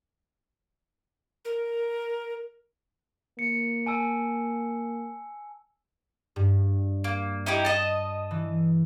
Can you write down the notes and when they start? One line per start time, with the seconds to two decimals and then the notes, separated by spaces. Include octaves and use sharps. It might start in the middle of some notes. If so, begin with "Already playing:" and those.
1.45 A#4
3.39 A#3 C#7
3.86 G#5 A5 E6
6.36 G2
7.04 A#3
7.46 D#4 E4 G4
7.65 D#5 A5
8.31 E3